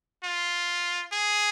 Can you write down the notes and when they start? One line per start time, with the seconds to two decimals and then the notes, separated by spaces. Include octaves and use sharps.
0.24 F4
1.13 G#4